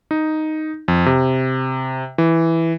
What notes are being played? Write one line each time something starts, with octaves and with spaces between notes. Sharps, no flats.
D#4
F2
C3
E3